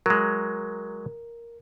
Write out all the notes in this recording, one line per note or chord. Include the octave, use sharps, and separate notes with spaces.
F#3 G#3 A#4